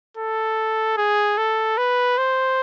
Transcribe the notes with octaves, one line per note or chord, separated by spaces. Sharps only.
A4
G#4
A4
B4
C5